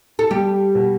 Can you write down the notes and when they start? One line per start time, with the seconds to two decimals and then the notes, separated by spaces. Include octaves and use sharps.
0.19 A4
0.31 G3 G4
0.75 B2